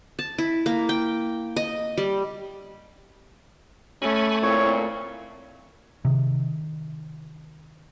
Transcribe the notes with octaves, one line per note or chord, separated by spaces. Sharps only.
A5
E4
A#3
G5
D#5
G3
A3 C#4 G#5 B5 C#6
A#2 C4 E4 C#5
C3 D#3